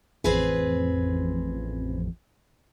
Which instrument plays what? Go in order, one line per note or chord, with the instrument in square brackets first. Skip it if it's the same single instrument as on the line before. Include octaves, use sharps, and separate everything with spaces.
[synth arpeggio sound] A1 F2 [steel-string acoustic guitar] C4 G#4 B4